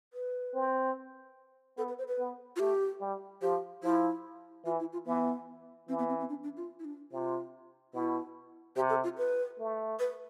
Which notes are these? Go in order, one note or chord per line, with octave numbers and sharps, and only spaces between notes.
B4
C4
B3 A4
B4
C5
B4
B3
F4
A3 G4
G3
F3 G4
F3 E4
E3 F4
E4
F4
E3 B3
E3 C4
B3
C4
C4
D4
D4
F4
E4
D4
C3 F4
B2 E4
C3 G4
A4
F4
B4
A3
B4